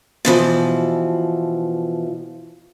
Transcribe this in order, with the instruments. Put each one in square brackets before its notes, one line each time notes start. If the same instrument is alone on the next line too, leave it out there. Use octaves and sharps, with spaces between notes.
[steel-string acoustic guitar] B2 E3 F3